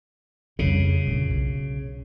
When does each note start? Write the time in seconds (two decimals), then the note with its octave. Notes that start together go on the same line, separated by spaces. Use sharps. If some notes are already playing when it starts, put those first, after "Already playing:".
0.59 F2 C#3 G3
1.07 A#2 D3
1.30 B1